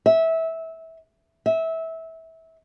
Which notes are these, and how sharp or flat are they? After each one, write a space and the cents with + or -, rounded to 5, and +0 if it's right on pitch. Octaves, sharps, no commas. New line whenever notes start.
E5 -20
E5 -20